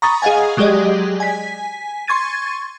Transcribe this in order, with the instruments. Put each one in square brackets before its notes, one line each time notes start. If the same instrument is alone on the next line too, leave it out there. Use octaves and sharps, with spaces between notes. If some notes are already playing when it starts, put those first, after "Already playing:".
[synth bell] A#5 B5 C#6 D#6 A6
G#4 D#5 F5 F#5 G#5
F#3 G#3 G4 G#4 D5 D#5
G#5 B6
C6 C#6 G#6 A6 D#7